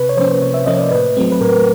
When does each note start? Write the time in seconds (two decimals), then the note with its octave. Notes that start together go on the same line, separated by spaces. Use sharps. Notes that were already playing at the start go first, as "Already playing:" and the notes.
Already playing: C3 B4
0.09 C#5
0.17 F3 A#3 C#4 C5
0.42 C3 C#5
0.54 E5
0.66 F3 A#3 C#4 D#5
0.78 D5
0.91 A2 B4
1.17 F#3 A3 C4
1.32 B4
1.41 A2 A#4